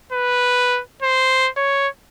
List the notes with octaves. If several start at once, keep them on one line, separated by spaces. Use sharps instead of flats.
B4
C5
C#5